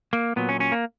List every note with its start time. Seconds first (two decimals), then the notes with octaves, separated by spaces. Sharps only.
0.13 A#3
0.36 A#2 F#3 B3
0.49 C#4
0.60 C#4
0.72 A#3